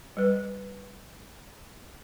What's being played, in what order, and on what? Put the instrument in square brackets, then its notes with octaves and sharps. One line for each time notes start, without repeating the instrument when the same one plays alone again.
[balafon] G3 B4